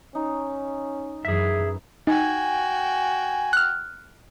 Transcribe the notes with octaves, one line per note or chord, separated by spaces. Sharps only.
C#4 D#4
F#2 E3 G#4 E5
D#4 F#4 G5 G#5
F6 F#6